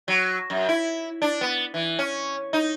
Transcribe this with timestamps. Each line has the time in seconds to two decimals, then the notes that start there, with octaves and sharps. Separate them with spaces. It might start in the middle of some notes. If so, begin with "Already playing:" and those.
0.08 F#3
0.50 F#2
0.69 E4
1.22 D4
1.41 B3
1.74 E3
1.99 C#4
2.53 D#4